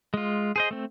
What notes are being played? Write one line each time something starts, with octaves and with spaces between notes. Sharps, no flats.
G#3 F4
G#4 C5 D#5
A3 C4